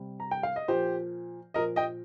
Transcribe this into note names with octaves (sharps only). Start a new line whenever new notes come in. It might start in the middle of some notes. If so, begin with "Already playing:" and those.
Already playing: C3 G3
A#5
G5
F5
D#5
A#2 F3 G4 C5
A#2 F3 A#4 D#5
D#5 G5